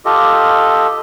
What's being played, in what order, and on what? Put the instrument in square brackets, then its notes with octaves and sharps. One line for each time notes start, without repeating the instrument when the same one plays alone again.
[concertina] F4 G4 A4 D#5